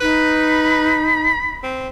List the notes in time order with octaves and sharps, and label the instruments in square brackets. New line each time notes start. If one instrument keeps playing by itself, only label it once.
[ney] D#4 [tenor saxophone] B4 [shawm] B5
[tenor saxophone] C4